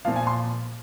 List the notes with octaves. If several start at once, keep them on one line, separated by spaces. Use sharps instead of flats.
A#2 F3 F5
G#5
C6